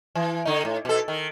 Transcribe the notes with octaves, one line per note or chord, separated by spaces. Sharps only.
E3
D3 D#4
A2
B2 A4
D#3